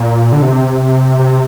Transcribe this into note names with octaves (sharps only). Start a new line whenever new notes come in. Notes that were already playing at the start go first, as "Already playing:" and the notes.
Already playing: A#2
D3
C3
C3